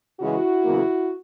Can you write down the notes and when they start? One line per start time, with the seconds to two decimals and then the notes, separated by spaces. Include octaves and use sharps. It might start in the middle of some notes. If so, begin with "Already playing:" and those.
0.20 C#3 E3 G#3 E4 F#4
0.65 E2 C#3 F#3 A#3